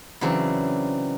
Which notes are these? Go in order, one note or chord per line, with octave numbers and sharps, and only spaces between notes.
C#3 E3 F#3 C4 D4